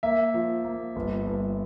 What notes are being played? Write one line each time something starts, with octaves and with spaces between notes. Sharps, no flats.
A#3 E5
F3
A#3
G1
G1